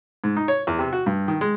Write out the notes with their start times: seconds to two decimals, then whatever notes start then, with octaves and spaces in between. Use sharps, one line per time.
0.24 G#2
0.37 D#4
0.48 C#5
0.67 E2
0.79 C3
0.93 F#4
1.06 G2
1.28 D#3
1.41 G#3